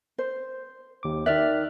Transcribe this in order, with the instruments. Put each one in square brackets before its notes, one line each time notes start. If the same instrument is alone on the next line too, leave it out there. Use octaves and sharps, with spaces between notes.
[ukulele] C5
[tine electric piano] D#2 D6
[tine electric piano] D#3 F6 F#6 [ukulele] D5 E5